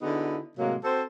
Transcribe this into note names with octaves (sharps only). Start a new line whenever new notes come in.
D3 B3 D#4 E4 F#4 G#4
A2 C3 F#3 G#3 A#3
C4 F#4 A4 C5